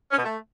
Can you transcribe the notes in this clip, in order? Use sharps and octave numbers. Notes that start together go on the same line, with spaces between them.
C#4
B2
A3